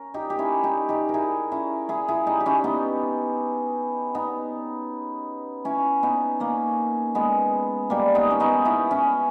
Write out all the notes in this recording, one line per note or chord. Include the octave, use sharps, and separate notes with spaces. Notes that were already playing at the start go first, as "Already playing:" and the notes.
Already playing: C#4 A#4
D#4 G4
G4
C#4 E4
D#4 G4
D#4 G4
A#4
E4 G#4
C#4 E4
E4 G#4
E4 G#4
D#4 G4
G4
C#4 E4
B3 D#4
B3 D#4
C#4 E4
B3 D#4
A#3 C#4
G#3 B3
G3 A#3
B3 D#4
C#4
B3 D#4
C#4 E4
C#4 E4